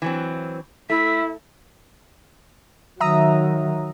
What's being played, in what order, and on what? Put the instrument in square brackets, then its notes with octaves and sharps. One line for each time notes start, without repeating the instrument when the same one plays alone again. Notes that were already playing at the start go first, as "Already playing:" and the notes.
[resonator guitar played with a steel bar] E3 F#3 C4
[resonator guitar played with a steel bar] A3 [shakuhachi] E4 [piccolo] B6
[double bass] D#3 F#3 [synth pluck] E5 A#5 D#6